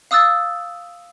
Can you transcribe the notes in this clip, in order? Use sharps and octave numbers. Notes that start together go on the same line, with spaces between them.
F5 D#6 E6 F#6 A6